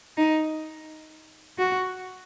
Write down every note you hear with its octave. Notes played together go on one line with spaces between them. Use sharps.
D#4
F#4